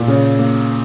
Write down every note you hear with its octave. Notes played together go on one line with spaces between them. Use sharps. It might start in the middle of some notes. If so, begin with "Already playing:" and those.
Already playing: A#2
C#3
A#3